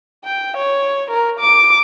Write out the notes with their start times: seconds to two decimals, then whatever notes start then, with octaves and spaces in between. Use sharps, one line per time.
0.24 G5
0.57 C#5
1.11 A#4
1.40 D6